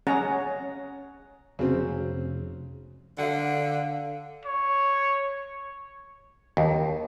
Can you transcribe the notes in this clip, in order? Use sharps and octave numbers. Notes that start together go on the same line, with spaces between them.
C#4 G#4 C#5 F#5 A#5
C#4
F1 C#3 F#3 C4
D3 F5 F#5
C#5
D#2